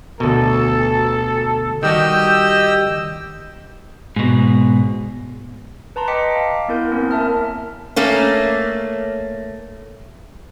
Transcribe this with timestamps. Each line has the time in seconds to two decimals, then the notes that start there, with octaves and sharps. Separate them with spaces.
0.20 D2 B2 A4
1.83 D#3 G3 F#4 G4 D#5 E6 G6
4.16 G#2 B2
5.96 B4 A5 A#5 C6
6.08 D#5 G5 D6 B6 C#7
6.35 F5
6.68 B3 E4 A#4 G6
6.91 A#3 C4 C#4 A#4
7.11 A#4 E5 A5 F6
7.96 A3 A#3 C#4